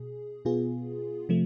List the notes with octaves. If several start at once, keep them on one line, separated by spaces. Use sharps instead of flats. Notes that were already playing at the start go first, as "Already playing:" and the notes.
Already playing: B2 G#4
B2 B3 F4 G#4
C3 F3 A3